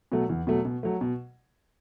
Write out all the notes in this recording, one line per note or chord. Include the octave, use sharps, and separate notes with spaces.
B2 F#3 A3
E2
B2 F#3 A3
B2
F#3 A3
B2